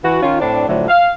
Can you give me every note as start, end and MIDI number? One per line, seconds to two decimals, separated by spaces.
0.04 0.22 52
0.04 0.22 66
0.23 0.38 51
0.23 0.38 61
0.23 0.38 65
0.41 0.67 45
0.41 0.67 60
0.41 0.67 62
0.68 0.88 45
0.68 0.88 50
0.68 0.88 53
0.68 0.88 54
0.68 0.88 57
0.89 1.12 77